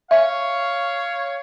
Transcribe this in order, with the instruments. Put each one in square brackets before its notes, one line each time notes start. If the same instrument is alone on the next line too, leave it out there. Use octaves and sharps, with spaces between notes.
[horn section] C#5 F5 [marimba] E5